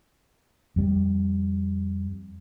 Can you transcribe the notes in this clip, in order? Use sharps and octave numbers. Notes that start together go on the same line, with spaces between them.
F2 G3